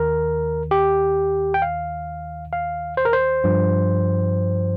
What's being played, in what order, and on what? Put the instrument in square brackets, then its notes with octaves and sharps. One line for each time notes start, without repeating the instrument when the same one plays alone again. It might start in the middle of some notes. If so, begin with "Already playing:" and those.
Already playing: [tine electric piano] D#2 D#3 A#4
G4
G5
F5
F5
C5
A#4
C5
G2 F3